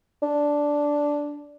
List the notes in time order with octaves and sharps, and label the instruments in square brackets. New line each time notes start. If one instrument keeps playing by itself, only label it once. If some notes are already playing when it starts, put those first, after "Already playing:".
[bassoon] D4